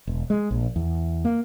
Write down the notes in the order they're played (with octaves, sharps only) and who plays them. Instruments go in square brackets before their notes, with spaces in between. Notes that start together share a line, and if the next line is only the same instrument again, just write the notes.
[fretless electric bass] E1
G#3
A#1
E2
A#3